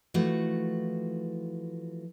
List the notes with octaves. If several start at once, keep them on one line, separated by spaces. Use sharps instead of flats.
E3 F3 A3 F#4